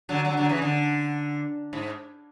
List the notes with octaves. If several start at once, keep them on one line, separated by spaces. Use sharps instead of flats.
D3 F#3
D3 F#3
D3 F#3
C#3 E3
D3
G#2